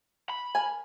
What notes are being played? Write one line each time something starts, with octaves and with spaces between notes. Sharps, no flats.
B5
A#4 G#5